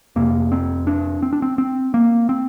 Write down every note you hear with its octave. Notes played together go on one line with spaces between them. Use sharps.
F1 F2 C3 A#3
C4
D4
C4
D4
C4
C4
A#3
C4